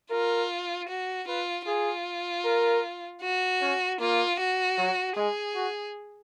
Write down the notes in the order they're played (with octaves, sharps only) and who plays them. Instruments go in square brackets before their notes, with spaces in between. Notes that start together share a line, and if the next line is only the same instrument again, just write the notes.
[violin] F4 [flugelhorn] A#4
[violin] F#4
[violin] F4 [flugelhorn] B4
[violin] F4 [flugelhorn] G#4
[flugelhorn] A#4
[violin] F#4
[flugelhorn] C#4
[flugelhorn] A#3 [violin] F4
[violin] F#4
[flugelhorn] F#3
[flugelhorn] G#3 [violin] G#4
[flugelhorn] F#4